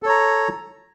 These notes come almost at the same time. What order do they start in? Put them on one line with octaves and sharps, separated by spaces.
A4 C#5 A#5